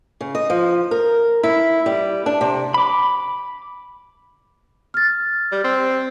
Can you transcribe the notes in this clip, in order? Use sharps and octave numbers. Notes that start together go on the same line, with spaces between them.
C#3
D#5
F3
A#4
E4
G3
D4
C3
B5 D6
F6 A6
G3
C4